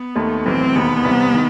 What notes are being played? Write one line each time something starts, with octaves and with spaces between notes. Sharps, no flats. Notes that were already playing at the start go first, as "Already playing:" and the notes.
Already playing: B3
D#2 D#3 A3
B1 A2 E3 C4
E1 D#2 D#3 B3
C2 C3 E3
D#3